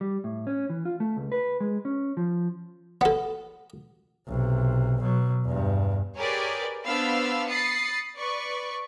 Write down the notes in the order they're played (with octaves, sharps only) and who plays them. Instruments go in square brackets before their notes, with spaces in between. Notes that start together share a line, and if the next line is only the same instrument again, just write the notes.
[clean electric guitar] G3
A2
C#4
E3
F4
A3
C#2
B4
G#3
C#4
F3
[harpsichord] B3 A4
[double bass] B1 C3
B2 F#3
E2 G2
[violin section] G4 G#4 A#4 B4 C#5 D5
B3 D4 C5 F5 B5 E6
B5 D#6 A6 C7 C#7
B4 D5 C#6